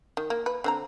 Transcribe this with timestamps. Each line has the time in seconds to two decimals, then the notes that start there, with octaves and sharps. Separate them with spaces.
0.17 D#3
0.30 A#3
0.46 B4
0.64 D3 C4 A#5